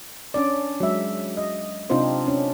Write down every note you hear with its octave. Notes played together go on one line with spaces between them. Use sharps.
C#4 D4 D5
F#3 G#3 E5
D#5
C3 C4 D4 D#4 F4 C5
C#4 D4